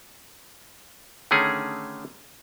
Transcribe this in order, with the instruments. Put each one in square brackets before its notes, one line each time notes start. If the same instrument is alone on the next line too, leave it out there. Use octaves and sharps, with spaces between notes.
[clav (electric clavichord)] D3 D#3 A3 C#4 G#4